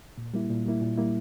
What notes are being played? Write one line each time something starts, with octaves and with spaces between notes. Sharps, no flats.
A#2
G3 A#3 E4
A#2
G3 A#3 E4
A#2
G3 A#3 E4